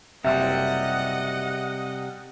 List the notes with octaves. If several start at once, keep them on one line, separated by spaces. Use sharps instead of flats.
F#1 C3 G3 D#5 E5 F#5